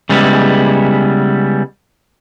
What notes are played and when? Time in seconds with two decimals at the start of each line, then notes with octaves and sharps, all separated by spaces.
0.09 C#3 G3 G#3 B3 E4